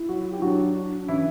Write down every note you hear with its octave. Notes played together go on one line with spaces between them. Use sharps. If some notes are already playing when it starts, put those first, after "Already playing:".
Already playing: E4
F#3 F#4
G4
F#3 D4 F#4
E3 C#4 E4